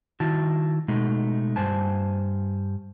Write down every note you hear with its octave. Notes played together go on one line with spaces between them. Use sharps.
D#3 E4 F#4 A5
B2 G#3 A3 D#4
G2 C5 G#5 A5